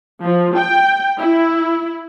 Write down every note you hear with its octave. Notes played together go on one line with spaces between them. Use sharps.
F3
G5
E4